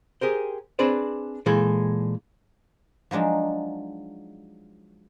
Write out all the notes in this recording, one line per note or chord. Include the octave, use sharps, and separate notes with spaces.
G4 G#4 A#4 C5
C4 D4 G#4 B4 C5 D5
A#2 E3 G#3 G#4 A4
F3 F#3 G#3 D4 D#4